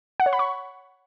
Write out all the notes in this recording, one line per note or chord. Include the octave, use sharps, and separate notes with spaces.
F#5
C#5
B5
C#6